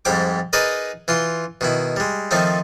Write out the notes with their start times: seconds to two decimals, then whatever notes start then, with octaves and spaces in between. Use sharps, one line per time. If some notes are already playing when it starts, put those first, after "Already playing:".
0.05 F2 G#2 G3 G4 D6
0.53 D#4 G#4 A#4 B4 D5 D#5
1.08 E3 F4 C6
1.61 B2 D#3 E4
1.96 G3 G#3
2.31 D#3 F3 A3 C4 D#4